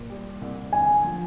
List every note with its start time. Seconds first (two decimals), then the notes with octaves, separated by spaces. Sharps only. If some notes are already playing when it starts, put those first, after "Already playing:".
Already playing: A#2
0.10 G3
0.41 C2
0.73 D3 G#5
1.04 F3